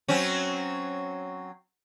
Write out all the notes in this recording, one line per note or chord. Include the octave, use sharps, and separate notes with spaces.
F#3 C4 C#4